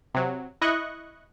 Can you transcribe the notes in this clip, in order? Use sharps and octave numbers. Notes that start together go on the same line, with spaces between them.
C3 F#3
E4 D#5 C#6 F#6